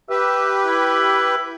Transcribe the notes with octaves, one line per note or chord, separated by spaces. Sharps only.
G4 B4 E5
E4